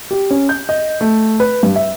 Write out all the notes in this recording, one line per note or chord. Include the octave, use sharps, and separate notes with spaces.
G4
C#4
G6
D#5
A3
B4
G2
E5